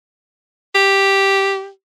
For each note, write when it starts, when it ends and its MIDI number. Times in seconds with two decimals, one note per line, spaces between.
0.75 1.69 67